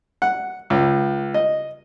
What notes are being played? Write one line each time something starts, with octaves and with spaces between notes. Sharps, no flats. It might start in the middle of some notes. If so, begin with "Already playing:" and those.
F#5
C#2
D#5